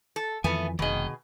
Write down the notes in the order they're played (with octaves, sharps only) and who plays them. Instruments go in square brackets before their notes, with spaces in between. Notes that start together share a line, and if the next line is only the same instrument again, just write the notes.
[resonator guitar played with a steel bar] A4
[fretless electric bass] F2 D#3 E3 [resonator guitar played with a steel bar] A3 B3 [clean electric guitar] G#5
[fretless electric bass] F1 [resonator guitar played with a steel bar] B2 G#4 [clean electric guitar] D#3 D#5